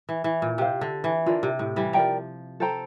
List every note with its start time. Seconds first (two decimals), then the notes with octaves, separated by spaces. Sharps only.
0.09 E3
0.24 E3
0.42 A#2
0.58 C3 G4 C5 F5
0.81 D3
1.04 E3
1.26 D3 F4 A#4 D5
1.43 C3
1.59 A2
1.76 E3 G3
1.93 F3 A#4 D5 G5 A#5
2.60 A4 C5 G5 A#5